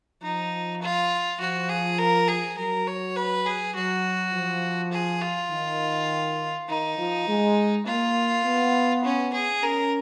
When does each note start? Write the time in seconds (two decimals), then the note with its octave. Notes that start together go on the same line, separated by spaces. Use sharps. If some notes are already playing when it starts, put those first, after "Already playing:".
0.22 F3 D#4
0.82 F4
1.40 F3 F#4
1.69 G#4
1.99 A#4
2.28 G#4
2.57 F#3 A#4
2.87 C#5
3.16 B4
3.46 G#4
3.75 F#3 F#4
4.34 F3
4.93 G#4
5.22 F4
5.51 D#3
6.69 D#3 D#4
6.98 F3
7.28 G#3
7.87 A#3 F4
8.45 B3
9.04 C#4
9.33 G#4
9.63 C#4 A#4